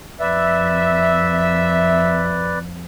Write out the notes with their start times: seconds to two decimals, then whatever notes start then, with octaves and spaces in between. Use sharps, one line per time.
0.20 F2 B4 D5 E5